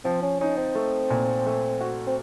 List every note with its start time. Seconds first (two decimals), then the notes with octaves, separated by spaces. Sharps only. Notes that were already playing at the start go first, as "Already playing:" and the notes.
0.05 F3 C4
0.23 C#4
0.40 C#4 D#4
0.58 C4
0.75 A3
1.10 A#2
1.46 A3
1.81 F#4
2.07 C4